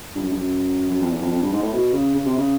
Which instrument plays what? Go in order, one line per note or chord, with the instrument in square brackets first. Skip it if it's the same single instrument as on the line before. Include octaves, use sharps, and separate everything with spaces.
[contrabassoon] G2
F#2
G2
F#2
F#2
F2
E2
F2
F2
G2
G#2
A2
B2
C#3
C#3
C3
C#3